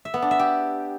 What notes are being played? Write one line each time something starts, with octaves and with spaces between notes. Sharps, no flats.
E5
B3
D4
E5
G4